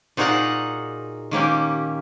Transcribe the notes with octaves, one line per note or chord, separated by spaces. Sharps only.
A#2 D#4 F#4 G#4 A#4 F#5
D#3 A#3 C#4 G4